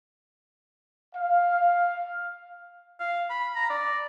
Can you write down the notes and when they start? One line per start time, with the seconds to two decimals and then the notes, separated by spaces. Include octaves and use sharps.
1.15 F5
3.00 F5
3.30 B5
3.55 A#5
3.70 D5